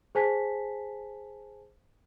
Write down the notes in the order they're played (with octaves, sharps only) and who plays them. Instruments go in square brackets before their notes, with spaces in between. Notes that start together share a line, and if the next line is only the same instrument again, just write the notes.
[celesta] G#4 C5 G#5 A5 B6